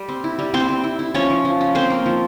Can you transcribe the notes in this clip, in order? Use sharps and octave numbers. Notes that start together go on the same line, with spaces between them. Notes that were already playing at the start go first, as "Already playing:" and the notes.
Already playing: G3
C4
E4
G3
C4 E4 C5
C4
E4
E4
F3 C#4 C#5
F3
F3
C#4
C4 C#4 C5
A#3
F3